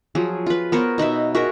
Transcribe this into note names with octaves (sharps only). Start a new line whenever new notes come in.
F3 F#3 G#4
F4 B4
B3 A#4 C5 C#5
B2 D#4 B4 E5
F#4 G#4 A#4 E5